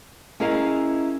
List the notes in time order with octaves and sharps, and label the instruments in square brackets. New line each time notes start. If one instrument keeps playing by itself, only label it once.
[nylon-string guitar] C#4 E4 G#4 A#4 D#5 F5